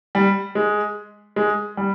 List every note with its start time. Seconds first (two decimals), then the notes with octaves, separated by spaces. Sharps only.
0.15 G3
0.55 G#3
1.36 G#3
1.77 G3